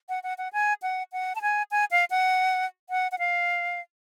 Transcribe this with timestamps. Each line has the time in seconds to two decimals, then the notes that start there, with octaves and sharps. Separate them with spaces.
0.09 F#5
0.23 F#5
0.38 F#5
0.53 G#5
0.82 F#5
1.12 F#5
1.35 A5
1.42 G#5
1.71 G#5
1.91 F5
2.10 F#5
2.90 F#5
3.12 F#5
3.19 F5